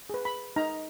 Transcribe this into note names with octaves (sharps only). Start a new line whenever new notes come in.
G#4 B4
B5
D#4 A#5